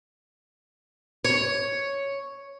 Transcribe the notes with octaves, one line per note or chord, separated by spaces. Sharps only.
C#5